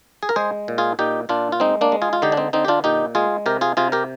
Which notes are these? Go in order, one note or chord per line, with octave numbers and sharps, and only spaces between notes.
G#4
A#4
G#3 G#4 C5
A#2
F4 G#4
A#2 D#4 G4
A#2 D4 F4
F4
G#3 C4 D#4
A#3 D4
G#3
F4 G#4
F4
D3 D#4 G4
D4
C4 D#4
D3 C4 D#4
G4
D4 F4
A#2 D#4 G4
G#3 F4 G#4
C3 G4 A#4
F4 G#4
C3 F4 G#4
G4 A#4